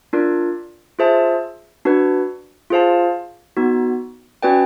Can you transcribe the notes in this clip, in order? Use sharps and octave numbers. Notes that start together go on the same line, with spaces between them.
D4 F4 A#4 D5
F4 G#4 C5 E5 A5
D4 F#4 B4
F4 G#4 C5 F5 A5
B3 D#4 F#4
C#4 F#4 B4 D5 G5